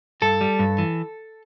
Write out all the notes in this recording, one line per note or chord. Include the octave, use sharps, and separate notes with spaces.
G2 A4
G3
G2
E3